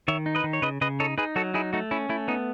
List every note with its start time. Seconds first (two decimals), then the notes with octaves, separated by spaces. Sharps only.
0.08 D#3 C#5 E5
0.26 D#4
0.35 B4 D#5
0.44 D#3
0.53 C#5
0.62 C#3 B4 D#5
0.81 C#3 B4 D#5
1.00 D#4 A4 C#5
1.18 D#4 G#4 B4
1.36 F#3 F#4 A4
1.54 D#4 E4 G#4
1.73 A3 D#4 F#4
1.91 C#4 E4
2.09 A3 E4
2.28 B3 D#4